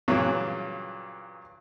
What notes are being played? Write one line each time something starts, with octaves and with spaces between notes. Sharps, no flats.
G2 A#2 C#3 E3 F#3